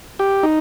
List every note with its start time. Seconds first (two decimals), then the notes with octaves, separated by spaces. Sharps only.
0.19 G4
0.43 D#4